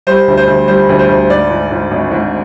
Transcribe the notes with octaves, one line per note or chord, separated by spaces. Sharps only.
G3 C5
D2
C5
D2
G3 C5
D2
C5
D2
G#2 D5
G#2
G#2
G#1
G#2